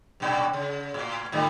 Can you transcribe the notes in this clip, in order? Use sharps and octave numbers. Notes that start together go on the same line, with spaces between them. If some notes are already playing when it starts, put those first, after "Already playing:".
G2 A#2 D4
C#3
A2
G#2 D3 G3